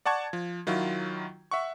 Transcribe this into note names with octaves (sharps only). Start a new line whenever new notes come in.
D5 F#5 A5 C#6 G#6
F3
D#3 F#3 E4 F4
E5 F#5 C#6